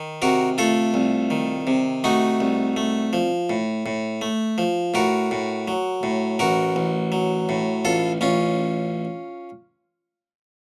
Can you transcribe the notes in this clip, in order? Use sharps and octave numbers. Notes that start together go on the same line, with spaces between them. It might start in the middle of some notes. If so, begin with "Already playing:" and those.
Already playing: D#3
C3 F#4 A#4
A3 F4 A4
C2
D#3
C3
A3 D#4 F#4
C2
A3
F3
A2
A2
A3
F3
A2 F#4 A#4
A2
F#3
A2
A1 F#4 A#4
A1
F#3
A2
A1 F4 A4
A1 C#4 F4